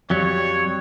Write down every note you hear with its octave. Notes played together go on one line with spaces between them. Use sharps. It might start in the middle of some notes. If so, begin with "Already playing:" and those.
F2 F#3 G3 C#5